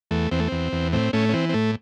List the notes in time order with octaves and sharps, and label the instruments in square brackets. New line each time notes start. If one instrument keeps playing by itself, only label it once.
[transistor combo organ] E2 A3
E2 C4
A3
E2 C4
E2
A2 C4
A2 A3 C#4
C#4
E3 C4
C4
A2 A3